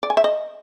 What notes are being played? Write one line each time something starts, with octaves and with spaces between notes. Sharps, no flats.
D5
G#5
E5
D#5